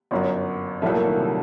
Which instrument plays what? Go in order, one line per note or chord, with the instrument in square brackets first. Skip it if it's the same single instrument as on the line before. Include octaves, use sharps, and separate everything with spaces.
[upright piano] G1 F#2 F#3
[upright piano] C2 A#2 F#3 A3 [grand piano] G3
[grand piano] A#3
D#3
C3